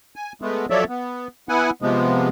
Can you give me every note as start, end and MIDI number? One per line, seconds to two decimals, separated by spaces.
0.16 0.32 80
0.42 0.66 56
0.42 0.66 57
0.42 0.66 59
0.70 0.84 53
0.70 0.84 54
0.70 0.84 69
0.70 0.84 73
0.70 0.84 74
0.70 0.84 76
0.89 1.28 59
1.49 1.70 59
1.49 1.70 64
1.49 1.70 78
1.49 1.70 80
1.82 2.29 48
1.82 2.29 53
1.82 2.29 56
1.82 2.29 59